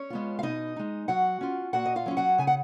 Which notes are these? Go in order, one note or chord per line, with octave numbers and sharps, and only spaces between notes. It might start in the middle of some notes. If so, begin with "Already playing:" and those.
Already playing: C#4 C#5
G#3 B3 F4
F5
B2 D#4 D#5
G#3 D#4
F#3 F#4 F#5
C#4 F4
A#2 F#4 F#5
D#5
F4 F5
F#3 C#4 F4
F#4 F#5
C#3 G#5
F#5